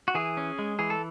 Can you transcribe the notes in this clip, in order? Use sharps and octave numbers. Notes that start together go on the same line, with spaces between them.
F#4
E3 G#4
C#4
G#3
E3 G#4
A4